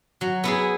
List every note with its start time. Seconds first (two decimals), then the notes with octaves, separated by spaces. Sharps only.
0.21 F#3
0.44 B3 E4 G#4